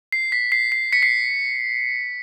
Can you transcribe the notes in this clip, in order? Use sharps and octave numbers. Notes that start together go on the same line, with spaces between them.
C7
B6
C7
C7
B6 C#7
C7